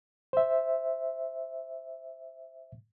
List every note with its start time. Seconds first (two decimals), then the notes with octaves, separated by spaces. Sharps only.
0.33 C5 E5